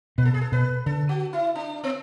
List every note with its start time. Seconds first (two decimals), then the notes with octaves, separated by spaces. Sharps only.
0.18 B2 B4
0.25 A4
0.34 G#4
0.41 A4
0.52 B2 B4
0.86 D3 A4
1.09 F#4
1.33 E4
1.55 D4
1.84 B3